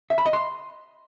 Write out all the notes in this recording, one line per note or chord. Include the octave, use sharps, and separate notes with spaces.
E5
B5
D#5
C6